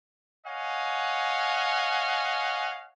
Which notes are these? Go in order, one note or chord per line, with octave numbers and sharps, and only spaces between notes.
C#5 D#5 F5 F#5 G#5